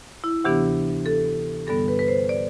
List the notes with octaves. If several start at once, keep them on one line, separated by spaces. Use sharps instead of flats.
E4
D2 C3 E3 B3 D4 G4
A4
G2 D3 G3 B3 A4
B4
B4
C5
D5